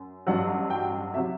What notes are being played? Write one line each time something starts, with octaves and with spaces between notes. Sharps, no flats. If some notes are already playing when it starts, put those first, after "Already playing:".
Already playing: F#2
A1 G2 F#3 F#5
G5
C3 F#3 E5